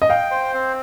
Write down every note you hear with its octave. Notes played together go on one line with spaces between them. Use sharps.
D#5
F5 G5
C5
C4